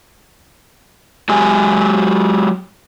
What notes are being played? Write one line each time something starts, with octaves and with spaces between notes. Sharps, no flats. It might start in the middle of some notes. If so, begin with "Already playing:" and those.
F#3 G#3 G4 G#5